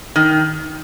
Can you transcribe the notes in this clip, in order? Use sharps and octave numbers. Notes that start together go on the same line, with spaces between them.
D#3